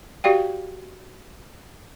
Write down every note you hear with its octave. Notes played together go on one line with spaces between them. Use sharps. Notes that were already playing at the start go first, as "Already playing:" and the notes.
F#4 G4 D5 F5 G5